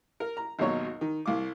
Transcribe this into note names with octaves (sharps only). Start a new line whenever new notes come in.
A#4
A#5
G#1 D#2 B2 F#3 C#5
D#3
C2 F5 D6